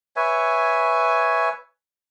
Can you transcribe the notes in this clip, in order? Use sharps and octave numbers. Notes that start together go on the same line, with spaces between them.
B4 C#5 E5 G#5